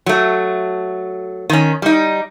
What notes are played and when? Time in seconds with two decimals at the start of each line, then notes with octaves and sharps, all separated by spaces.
0.06 F#3 A3
1.50 D#3 C#4
1.82 G3 D#4